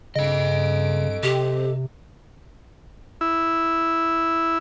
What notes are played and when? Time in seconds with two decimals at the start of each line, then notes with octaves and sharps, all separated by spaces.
0.15 G2 C#3 A4 D#5 D7
1.23 C3 C4 G4
3.21 E4